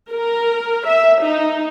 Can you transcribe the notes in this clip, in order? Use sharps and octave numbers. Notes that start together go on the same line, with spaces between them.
A#4
E5
D#4